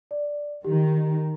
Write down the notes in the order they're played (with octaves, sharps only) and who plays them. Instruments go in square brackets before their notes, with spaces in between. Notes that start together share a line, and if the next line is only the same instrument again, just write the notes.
[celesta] D5
[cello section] D#3 [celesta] G4